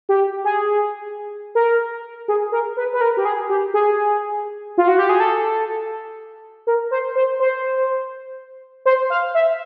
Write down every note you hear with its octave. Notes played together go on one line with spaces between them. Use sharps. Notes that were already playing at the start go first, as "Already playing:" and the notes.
G4
G#4
A#4
G#4
A#4
B4
B4
A#4
G4
G#4
G4
G#4
F4
F#4
G4
G#4
A4
A#4
C5
C5
C5
C5
F5
E5